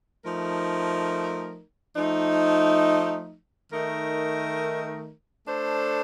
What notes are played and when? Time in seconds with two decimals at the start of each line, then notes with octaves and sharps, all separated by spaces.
0.22 F3 A3 D#4 A#4
1.96 F3 A3 D#4
3.71 D#3 A3 D#4 A#4
5.45 A3 D4 A4 C5